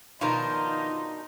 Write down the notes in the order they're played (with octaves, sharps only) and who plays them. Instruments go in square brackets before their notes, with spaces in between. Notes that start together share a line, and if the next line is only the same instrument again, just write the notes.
[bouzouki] B2 D4 A#4 [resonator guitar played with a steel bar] D#3 F3 F4 [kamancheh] D#4 [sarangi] C6